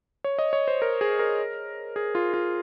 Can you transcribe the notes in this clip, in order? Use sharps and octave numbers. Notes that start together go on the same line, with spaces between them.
C#5
D#5
C#5
C5
A#4
G#4
A#4
G#4
F4
F4